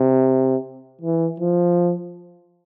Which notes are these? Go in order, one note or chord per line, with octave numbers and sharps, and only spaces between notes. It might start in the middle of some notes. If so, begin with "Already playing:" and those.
Already playing: C3
E3
F3